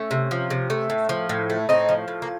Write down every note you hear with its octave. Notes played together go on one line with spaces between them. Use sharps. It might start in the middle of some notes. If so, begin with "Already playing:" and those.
Already playing: A3 C#4
C3
F3
C3
A3
A2
F3
A2
A3
A2 C4 D#4
F3
A2
A#3